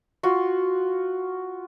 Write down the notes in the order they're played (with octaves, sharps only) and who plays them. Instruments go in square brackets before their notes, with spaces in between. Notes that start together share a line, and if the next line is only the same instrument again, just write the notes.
[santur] F4 F#4